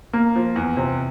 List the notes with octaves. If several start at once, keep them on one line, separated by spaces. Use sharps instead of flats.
A#3
F3
E2
C3